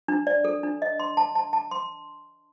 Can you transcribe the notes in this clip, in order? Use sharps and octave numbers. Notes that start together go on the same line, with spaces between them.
D4
D5
A4
D4
D#5
C6
A5
A5
A5
C6